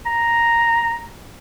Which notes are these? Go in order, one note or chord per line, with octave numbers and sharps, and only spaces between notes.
A#5